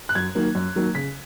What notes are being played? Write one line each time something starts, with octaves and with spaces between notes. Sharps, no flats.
F#6
F#2 G#6
D#3 F#3 A#3
F#2
D#3 F#3 A#3
C#3 B6